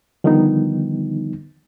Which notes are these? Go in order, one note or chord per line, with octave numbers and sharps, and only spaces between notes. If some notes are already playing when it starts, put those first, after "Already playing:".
D3 D#3 F3 G3 B3 D#4